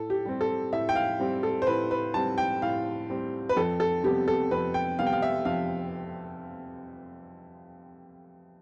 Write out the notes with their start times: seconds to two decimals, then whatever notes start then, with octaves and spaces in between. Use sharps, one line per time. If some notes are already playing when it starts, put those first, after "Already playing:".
Already playing: A2 A4
0.10 G4
0.25 G3 C4
0.41 A4
0.73 A2 E5
0.89 G5
0.96 F5
1.20 G3 C4
1.43 A4
1.62 C5
1.67 A2 B4
1.91 B4
2.14 G3 C4 A5
2.38 G5
2.62 A2 F5
3.10 G3 C4
3.49 B4
3.56 F2 A4
3.80 A4
4.04 C3 G3 B3 G4
4.28 A4
4.51 F2 B4
4.74 G5
4.99 C3 G3 B3 F5
5.07 G5
5.13 F5
5.22 E5
5.45 F2 F5